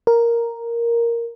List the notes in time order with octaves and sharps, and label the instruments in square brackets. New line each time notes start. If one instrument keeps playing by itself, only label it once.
[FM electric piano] A#4